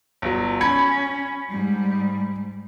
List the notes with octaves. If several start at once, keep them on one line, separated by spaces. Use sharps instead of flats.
G1 F#3
C#4 B5 G#6 C#7
G#2 G3